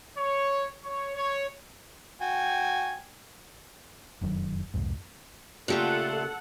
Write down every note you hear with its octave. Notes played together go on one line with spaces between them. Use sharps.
C#5
C#5
C#5
F#4 G5 G#5
F1 F#2 D#3 F#3
C2 F2 G#2
A#2 C#3 A3 A#3 F4 G4 A4 F#5